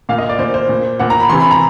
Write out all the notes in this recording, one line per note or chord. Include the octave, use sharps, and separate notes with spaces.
A#2 F5
D#5
D5
A#2 C5
C5
A#2
A#2 F#5
A#5
B5
C3 E3 C6
B5
A#5